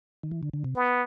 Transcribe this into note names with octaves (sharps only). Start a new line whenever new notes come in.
D#3
E3
D3
D3
C3
B3